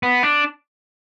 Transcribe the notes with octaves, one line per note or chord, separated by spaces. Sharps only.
B3
D4